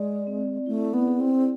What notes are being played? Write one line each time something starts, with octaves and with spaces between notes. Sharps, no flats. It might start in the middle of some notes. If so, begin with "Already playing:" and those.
Already playing: G#3 D5
C4
A3 E4
B3
G#4
C4